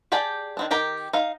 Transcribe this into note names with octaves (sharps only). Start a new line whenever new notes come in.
G4 G#4 D5 G5 A5
D#3 C4 D4
D#3 G4 A#4 G5
D#4 F5